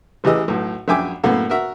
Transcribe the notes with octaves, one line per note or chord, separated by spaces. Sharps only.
A1 E3 G4 G#4 D#5 E6
B1 A2
A#1 F#2 E5 G5 G#5 D6
F#2 A2 A#3 B3 A4
F#4 A#4 E5